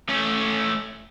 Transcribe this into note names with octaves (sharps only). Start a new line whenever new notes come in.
A3 C#4